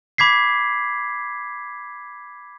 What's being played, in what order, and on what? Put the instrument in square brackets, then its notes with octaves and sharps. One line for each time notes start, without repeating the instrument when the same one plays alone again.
[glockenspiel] B5 D6 G#6 B6 C7